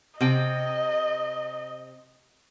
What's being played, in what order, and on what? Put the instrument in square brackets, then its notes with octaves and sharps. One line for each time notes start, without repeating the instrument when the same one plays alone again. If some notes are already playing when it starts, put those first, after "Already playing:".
[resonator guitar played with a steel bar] C3 G5 [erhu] D#5